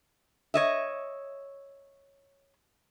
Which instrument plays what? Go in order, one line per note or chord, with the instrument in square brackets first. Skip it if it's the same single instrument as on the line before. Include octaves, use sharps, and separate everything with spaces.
[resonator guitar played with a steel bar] C#5 D#5 E5